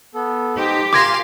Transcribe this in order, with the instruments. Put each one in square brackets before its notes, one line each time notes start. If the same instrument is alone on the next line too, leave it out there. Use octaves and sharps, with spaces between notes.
[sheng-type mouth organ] B3 A4
[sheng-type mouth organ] D#4 C5 [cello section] G4
[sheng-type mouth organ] F4 A#4 G#5 [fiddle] F5 C6 [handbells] D6 G#6 A#6